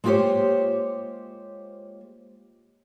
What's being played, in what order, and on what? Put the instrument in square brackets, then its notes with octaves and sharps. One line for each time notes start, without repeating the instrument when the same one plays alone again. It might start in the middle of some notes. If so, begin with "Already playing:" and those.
[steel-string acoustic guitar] G#3 A#3 F4 G4 C5 C#5